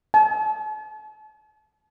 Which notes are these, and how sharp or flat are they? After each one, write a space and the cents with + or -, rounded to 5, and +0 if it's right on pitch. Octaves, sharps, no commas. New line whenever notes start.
A5 -40